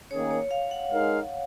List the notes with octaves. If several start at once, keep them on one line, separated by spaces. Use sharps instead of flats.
D#3 A#3 C#4 G#4 C#5
C#5
F5
F#5
G#3 D#4 A#4 F5